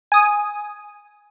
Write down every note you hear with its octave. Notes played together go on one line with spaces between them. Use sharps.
G#5 D#6